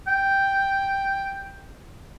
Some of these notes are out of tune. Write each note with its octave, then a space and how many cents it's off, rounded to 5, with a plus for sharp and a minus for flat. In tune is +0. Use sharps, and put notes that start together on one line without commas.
G5 +0